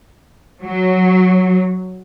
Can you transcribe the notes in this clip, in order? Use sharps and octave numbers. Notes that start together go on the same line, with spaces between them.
F#3